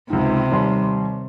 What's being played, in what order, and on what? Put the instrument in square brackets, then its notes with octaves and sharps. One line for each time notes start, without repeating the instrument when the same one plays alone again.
[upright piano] C#2 G#2 [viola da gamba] C3
[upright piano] D#2 G3 C6